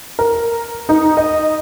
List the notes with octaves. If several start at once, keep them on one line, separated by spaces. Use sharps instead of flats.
A#4
D#4
D#5